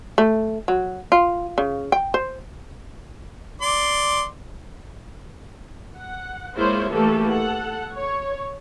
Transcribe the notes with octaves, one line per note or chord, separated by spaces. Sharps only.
A3
F#3
F4
C#3
G5
C5
D5 C6 D6
F#5
G#3 A#3 E4 F4 C5 C#5
E3 A3 A#3 G4 A4
A4 F#5
C#5